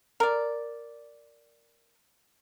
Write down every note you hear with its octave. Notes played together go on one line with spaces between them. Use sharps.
A#4 D5